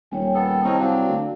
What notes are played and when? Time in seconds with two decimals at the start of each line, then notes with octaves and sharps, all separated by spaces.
0.12 D#1 C#5 G5 G#5
0.34 B3 A4 G5
0.64 C2 C4 C#4 D#4 A5
0.79 F#3 C4 D4 F#4 D5 F5
1.09 D2